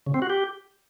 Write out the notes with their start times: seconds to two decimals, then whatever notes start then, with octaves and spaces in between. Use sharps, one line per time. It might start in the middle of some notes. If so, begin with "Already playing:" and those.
0.06 C#3
0.14 C4
0.22 F#4
0.30 G4